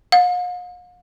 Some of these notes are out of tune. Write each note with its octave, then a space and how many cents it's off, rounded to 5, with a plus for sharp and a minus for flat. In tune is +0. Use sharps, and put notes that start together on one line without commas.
F5 +45